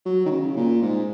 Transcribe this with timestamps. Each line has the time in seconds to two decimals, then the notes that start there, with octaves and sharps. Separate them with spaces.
0.06 F#3
0.26 D#3
0.31 C#3
0.57 A#2
0.82 G#2